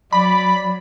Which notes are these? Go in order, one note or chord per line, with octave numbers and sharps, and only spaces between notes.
F#3 D5 B5